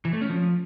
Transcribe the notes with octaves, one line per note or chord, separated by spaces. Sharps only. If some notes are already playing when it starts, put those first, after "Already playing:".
E3
A3
C#4
F3